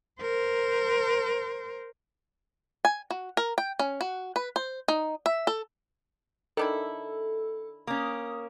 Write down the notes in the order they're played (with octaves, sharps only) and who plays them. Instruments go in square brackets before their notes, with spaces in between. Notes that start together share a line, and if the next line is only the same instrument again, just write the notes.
[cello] A#4 C5
[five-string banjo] G#5
F#4
A#4
G5
C#4
F#4
B4
C5
D#4
E5
A4
[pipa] D#3 D4 E4 [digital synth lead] A4
[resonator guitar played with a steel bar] A#3 C#4 [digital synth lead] D#6